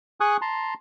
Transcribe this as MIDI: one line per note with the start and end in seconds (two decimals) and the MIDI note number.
0.20 0.37 68
0.20 0.37 80
0.20 0.37 85
0.20 0.37 87
0.20 0.37 90
0.42 0.74 81
0.42 0.74 82
0.42 0.74 84